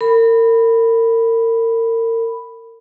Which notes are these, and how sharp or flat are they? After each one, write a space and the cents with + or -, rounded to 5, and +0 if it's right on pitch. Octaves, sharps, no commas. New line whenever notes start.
A#4 -35 B5 +0